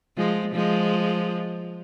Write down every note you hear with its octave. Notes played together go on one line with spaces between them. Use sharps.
F3 G#3
F3 G#3